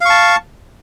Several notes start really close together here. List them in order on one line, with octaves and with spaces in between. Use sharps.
F5 C#6 A5